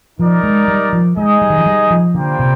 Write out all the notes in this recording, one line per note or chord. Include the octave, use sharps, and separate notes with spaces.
F3 D#4 A#4 D5
G#3
G3
F3
G#3 D#4 G#4 D#5
G3
D#3
F3
G3
F3
D3 G3 A#3 F4 C5 G5
C3